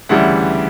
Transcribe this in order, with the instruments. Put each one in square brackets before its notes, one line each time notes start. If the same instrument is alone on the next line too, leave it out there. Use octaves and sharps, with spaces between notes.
[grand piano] D2 C#3 E3 G3 F#5